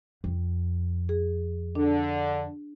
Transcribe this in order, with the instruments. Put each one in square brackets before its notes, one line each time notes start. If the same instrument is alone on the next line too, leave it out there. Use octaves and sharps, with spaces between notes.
[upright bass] F2
[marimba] G#4
[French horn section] D3 [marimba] D4